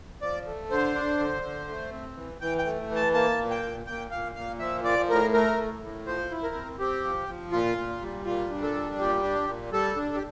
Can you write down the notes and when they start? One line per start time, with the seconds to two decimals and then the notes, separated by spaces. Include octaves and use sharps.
0.22 F3 D5
0.46 A3
0.71 D3 C5
0.95 D4
1.18 D3
1.43 D3
1.68 A3
1.91 C4
2.16 E3
2.41 E3 G5
2.58 G5
2.65 A3
2.90 E3
2.96 A5
3.14 A#3 A5
3.39 A#2
3.50 G5
3.63 A#2
3.86 A#2 G5
4.11 A#2 F5
4.35 A#2 F5
4.60 F3 E5
4.84 F3 D5
5.09 A2 A#4
5.33 A3 A#4
5.57 A2
5.82 A2
6.06 F3 C5
6.31 E4
6.43 A#4
6.55 C4
6.79 C4 G4
7.04 F3
7.28 F3
7.52 A#2 F4
7.78 A#2
8.01 G3
8.25 A#2 F4
8.50 D4
8.62 A4
8.74 G3
8.99 A#2 G4
9.23 D4
9.47 A#2
9.72 G3 A4
9.96 D4
10.09 A4
10.15 G4